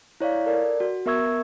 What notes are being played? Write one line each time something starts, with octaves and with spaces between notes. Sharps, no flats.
E4 C#5 D5 F5
A4 A#4 D5
F#4
B3 A#4 E5 C#6 E6 G#6